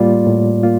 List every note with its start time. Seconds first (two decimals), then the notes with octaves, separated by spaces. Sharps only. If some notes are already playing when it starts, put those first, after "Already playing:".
Already playing: A2 G3 A#3 F4 D5
0.26 A2
0.63 A#3 F4